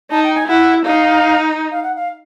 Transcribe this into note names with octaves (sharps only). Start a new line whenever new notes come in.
D#4 A5
G5
G#5
E4 F#5
D#4 F5
F5
F#5
F5